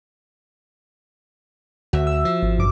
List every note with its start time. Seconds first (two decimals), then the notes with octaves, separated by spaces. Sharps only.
1.93 D2 F#4 E5
2.07 E6
2.25 F3
2.43 G#1
2.58 B1 G2 D6